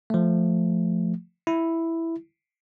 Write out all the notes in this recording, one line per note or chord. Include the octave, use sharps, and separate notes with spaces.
F3 A3
E4